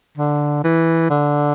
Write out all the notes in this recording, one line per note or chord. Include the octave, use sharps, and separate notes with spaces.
D3
E3
D3